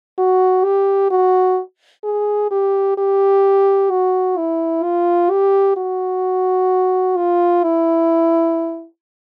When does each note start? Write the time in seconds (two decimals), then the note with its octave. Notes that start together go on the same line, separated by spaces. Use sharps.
0.18 F#4
0.65 G4
1.11 F#4
2.04 G#4
2.51 G4
2.98 G4
3.91 F#4
4.37 E4
4.83 F4
5.31 G4
5.77 F#4
7.17 F4
7.63 E4